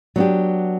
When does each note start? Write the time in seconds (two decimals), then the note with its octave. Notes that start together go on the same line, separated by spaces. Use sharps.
0.16 F#3 B3 D4 G4